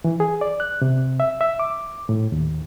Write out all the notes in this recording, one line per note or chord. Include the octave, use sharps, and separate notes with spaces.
E3
G#4
D5
F#6
C3
E5
E5
D6
A2
D#2